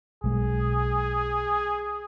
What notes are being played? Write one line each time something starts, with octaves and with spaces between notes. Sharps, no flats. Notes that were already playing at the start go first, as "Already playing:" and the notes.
B1 G#3 G#4